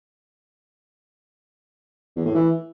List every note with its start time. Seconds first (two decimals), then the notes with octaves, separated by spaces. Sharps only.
2.16 E2
2.25 A2
2.35 E3